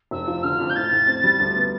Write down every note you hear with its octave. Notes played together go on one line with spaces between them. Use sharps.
F1 E6
F3
D3 F6
F2
G6
A2 A6
A2
C4
G3
D2
B3